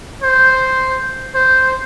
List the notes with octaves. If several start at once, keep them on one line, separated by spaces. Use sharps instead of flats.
C5
C5